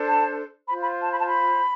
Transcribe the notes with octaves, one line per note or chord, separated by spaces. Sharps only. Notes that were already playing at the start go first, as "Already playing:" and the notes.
Already playing: D4 A4 C5
A5
F4 C5 B5
B5
A5
B5
A5
B5